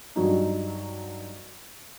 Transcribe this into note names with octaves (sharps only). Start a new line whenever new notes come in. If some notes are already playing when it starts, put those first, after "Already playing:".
G2 F#3 D#4